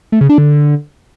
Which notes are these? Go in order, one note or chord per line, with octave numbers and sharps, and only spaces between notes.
A3
C#3
D4
D3